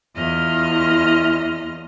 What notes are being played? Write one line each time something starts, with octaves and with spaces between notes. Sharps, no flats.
E2 E3 F4 D#5 F6